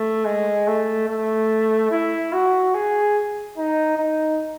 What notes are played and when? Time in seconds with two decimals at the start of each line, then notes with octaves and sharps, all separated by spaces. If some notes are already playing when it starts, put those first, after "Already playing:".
Already playing: A3
0.25 G#3
0.67 A3
1.08 A3
1.91 E4
2.33 F#4
2.74 G#4
3.57 D#4
3.98 D#4